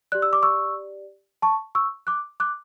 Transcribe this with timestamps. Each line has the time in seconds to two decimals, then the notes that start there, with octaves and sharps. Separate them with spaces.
0.12 G4 D5 F#6
0.22 E6
0.33 D6
0.43 C#6 E6
1.42 A5 C#6
1.75 C#6 E6
2.07 D6 F#6
2.40 D6 F#6